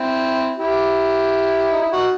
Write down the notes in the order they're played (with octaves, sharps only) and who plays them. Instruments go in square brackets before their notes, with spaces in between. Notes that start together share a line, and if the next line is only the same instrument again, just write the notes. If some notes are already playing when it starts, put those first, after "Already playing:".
Already playing: [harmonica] C4 E4
E4 G4
D#4
E4
D#4 F#4